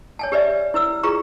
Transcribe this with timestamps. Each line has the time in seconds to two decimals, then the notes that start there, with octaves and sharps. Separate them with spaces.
0.19 C#5 G#5 A5
0.32 G4 B4 D5 E5
0.74 E4 B4 E6
1.03 E4 F4 G#4 B4 A#5 C#6